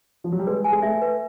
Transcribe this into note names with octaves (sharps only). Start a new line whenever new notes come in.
F3
F#3
G3
G#3 B4
G#5
G#3
A3 E5
B4